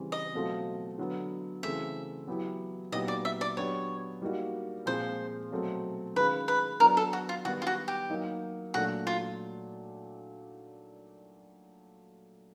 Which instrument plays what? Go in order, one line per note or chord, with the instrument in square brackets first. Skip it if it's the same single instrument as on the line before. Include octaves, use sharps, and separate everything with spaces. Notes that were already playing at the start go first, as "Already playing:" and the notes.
Already playing: [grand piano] C#3 E3 G3 C4
[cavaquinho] D#5
[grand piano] B2 F#3 A3 C4 F4
D3 F#3 B3
[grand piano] C#3 E3 A3 C4 [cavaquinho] E5
[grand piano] F#3 B3 E4 G4
[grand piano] A#2 F#3 B3 D#4 G4 [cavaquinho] D#5
[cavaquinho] D5
E5
D5
[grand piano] F#3 B3 D4 G4 [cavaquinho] C#5
[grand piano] G3 A#3 D#4 F#4
[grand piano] A#2 F3 G#3 C4 F4 [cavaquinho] C5
[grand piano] B2 F#3 A3 C4
[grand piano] D#3 G#3 C#4 F4 [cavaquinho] B4
[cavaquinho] B4
[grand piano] F#3 B3 D4 [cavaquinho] A#4
[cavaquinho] A4
F#4
F4
[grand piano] D#3 G3 B3 [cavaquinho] F#4
[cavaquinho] F4
F#4
G4
[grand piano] F#3 A#3 D#4 F#4
[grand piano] A#2 F#3 A3 D4 [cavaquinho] F#4
[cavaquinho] F4